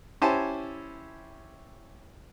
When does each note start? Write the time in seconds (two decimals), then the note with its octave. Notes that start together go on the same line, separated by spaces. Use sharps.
0.22 C#4 E4 G4 C5 G#5 A5